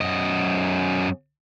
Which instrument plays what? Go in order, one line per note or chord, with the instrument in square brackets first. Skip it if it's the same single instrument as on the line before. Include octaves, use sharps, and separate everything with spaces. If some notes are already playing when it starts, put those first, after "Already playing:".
[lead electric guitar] F#2 D#5